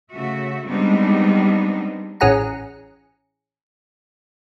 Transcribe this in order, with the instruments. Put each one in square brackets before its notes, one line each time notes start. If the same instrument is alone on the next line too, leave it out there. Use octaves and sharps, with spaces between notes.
[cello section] C#3 A3 F#4 E5
G3 G#3 B3 C4 D4 D#4
[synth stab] A1 C#4 G#4 F#5 A#5 C#7